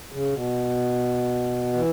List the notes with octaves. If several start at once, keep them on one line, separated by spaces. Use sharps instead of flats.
C#3
B2
E3